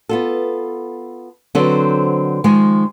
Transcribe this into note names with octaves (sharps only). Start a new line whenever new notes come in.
B3 F4 A4
D3 F#3 C4 A4 B4 C5
D#3 F3 G#3